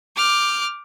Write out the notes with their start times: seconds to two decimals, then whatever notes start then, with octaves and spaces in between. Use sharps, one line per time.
0.15 D6 F6 G6